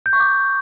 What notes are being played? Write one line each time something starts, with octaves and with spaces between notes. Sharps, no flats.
G6
C#6
D6